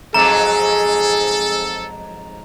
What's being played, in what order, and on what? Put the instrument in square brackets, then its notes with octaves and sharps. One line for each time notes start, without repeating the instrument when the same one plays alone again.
[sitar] F2 G#2 F#3 [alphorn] G#4 [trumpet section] A4 [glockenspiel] A#5